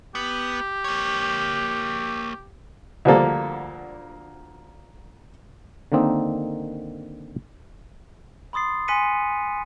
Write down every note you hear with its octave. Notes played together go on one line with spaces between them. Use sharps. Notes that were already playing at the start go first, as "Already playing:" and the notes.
B3 G4
A#3 C#5
D2 D3 F3 G3 A#3 A4
D3 D#3 A#3 C4 D#4
B5 C6 D#6 A6 C7
G#5 C6 F#6 B6 C#7 D#7